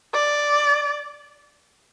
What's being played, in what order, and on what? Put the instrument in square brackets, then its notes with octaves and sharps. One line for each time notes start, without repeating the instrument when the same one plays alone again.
[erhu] D5